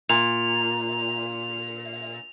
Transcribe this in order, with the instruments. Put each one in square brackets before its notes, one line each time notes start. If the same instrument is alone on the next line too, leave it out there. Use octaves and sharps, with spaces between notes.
[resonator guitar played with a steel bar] A#2 [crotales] F7